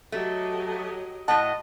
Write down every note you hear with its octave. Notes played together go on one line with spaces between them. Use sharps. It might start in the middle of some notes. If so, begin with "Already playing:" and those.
F#3 A3 G4 D#5
A2 A3 D#5 F#5 A5